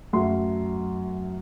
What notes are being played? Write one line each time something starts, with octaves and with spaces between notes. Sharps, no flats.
F#2 F#3 A3 C6